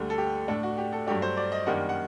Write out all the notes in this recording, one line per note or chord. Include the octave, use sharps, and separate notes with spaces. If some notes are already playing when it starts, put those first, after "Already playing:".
Already playing: D2 D3 G3
A4
G4
A2 A3 D4 A4
F#4
G4
A4
G2 F#3 A3 D4 G4
C5
D5
D#5
F#2 D#3 G3 A#3 D4 F#5
F#5